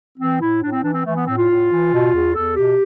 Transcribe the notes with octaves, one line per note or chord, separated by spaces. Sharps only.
E3 C4
A2 E4
A2 D4
C4
E3 D4
C4
E3 A3
B3
A2 C4
F4
A2
E3
B2
E2
E2 A4
B2 G4